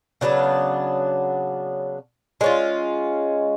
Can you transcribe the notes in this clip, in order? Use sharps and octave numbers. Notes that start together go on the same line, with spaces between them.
C#3 F#3 B3 D4
G#3 C#4 F4